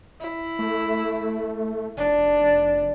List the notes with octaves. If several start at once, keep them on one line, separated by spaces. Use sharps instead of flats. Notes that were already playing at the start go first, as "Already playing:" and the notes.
E4
A3
F1 D4